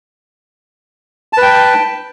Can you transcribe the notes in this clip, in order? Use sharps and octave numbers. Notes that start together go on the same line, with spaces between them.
B4 G5 A5